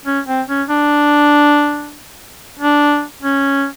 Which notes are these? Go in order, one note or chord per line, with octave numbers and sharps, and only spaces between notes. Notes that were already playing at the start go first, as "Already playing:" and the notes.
C#4
C4
C#4
D4
D4
C#4